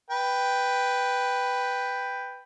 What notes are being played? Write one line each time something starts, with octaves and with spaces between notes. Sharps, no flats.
B4 G5